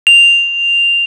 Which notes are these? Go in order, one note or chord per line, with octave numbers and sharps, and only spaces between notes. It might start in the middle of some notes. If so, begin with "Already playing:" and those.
F7